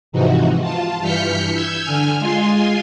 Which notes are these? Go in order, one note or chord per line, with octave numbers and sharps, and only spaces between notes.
G#2 C3 E3 F3 D#4 F#4
F4 A5
G2 E3 F6 G6 B6 C#7
E6 G6 G#6
D3 G#5 F6
G#3 F4 G#5 C6